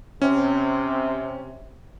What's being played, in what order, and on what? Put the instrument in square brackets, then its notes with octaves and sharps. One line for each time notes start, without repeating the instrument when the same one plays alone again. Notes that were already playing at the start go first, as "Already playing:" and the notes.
[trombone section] C3 [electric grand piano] C#4